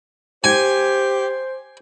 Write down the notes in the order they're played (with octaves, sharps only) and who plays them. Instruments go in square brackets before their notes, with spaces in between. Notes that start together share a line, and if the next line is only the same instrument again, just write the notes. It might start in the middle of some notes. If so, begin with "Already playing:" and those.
[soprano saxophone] G4 [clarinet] C5 [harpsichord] G#5